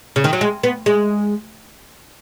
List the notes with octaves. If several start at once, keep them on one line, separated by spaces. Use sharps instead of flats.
C#3
D#3
F#3
G#3
B3
G#3